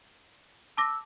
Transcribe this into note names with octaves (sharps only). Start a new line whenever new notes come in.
A5 D6 E6 A#6